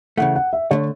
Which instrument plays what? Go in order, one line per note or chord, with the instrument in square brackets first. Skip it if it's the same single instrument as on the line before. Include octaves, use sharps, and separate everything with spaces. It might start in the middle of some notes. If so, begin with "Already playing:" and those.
[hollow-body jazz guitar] C#3 E3 A3 [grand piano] F#5
[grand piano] F#5
E5
[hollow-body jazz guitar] D3 A3 [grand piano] C#5